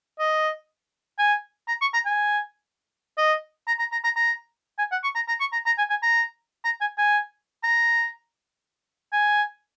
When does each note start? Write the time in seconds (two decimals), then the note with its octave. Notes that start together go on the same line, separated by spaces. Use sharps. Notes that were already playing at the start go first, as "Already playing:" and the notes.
0.19 D#5
1.19 G#5
1.68 A#5
1.82 C#6
1.94 A#5
2.06 G#5
3.18 D#5
3.68 A#5
3.79 A#5
3.92 A#5
4.04 A#5
4.16 A#5
4.79 G#5
4.92 F#5
5.04 C#6
5.15 A#5
5.28 A#5
5.40 C#6
5.53 A#5
5.66 A#5
5.78 G#5
5.90 G#5
6.03 A#5
6.65 A#5
6.81 G#5
6.98 G#5
7.64 A#5
9.13 G#5